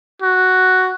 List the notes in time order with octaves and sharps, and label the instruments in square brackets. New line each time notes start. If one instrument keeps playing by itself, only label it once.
[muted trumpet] F#4